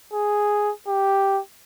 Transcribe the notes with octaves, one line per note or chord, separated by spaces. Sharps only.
G#4
G4